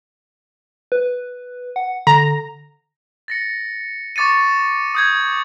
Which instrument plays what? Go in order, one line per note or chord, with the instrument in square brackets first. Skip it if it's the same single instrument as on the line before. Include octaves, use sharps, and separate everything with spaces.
[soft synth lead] B4
F#5
[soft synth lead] D3 [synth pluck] A#5
[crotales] A6 A#6 C#7
C#6 D6 A6 C#7 D#7
D#6 G6 G#6